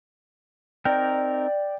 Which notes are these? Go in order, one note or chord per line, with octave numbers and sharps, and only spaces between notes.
C4 D#4 A#4 D5 G5